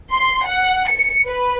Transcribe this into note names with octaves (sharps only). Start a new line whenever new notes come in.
C6
F#5
C#7
B4